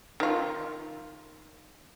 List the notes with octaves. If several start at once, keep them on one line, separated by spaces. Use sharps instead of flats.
D#3 F4